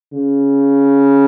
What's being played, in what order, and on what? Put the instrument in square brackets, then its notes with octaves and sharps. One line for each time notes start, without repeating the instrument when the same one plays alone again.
[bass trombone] C#3